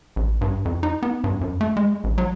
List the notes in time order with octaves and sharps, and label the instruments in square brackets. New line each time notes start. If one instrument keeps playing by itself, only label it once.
[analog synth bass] A1
G2
F2
D#4
B3
G2
F#2
A3
G#3
A1
F#3